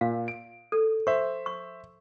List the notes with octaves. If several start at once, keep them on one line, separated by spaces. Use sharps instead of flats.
A#2 F5
D7
A4
C5 E5 C#6
C#6